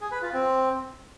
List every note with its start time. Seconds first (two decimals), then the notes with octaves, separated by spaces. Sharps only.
0.01 G#4
0.11 B4
0.22 F4
0.33 C4